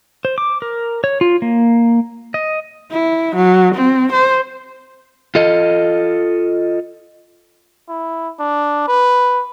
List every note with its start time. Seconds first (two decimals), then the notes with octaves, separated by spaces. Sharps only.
0.25 C5
0.38 D6
0.62 A#4
1.04 C#5
1.21 F4
1.42 A#3
2.34 D#5
2.91 E4
3.35 F#3
3.75 C4
4.12 C5
5.35 F4 A4 D#5
7.89 E4
8.39 D4
8.88 B4